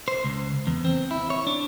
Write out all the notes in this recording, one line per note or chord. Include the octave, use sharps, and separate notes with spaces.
C5
C#2
E2
C4
E4
C#5
D4